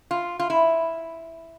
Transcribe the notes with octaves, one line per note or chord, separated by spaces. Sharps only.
F4
F4
E4